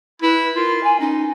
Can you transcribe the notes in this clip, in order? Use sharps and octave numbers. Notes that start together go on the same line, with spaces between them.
E4 B4
F4 A#4
G#5
C#4 D#4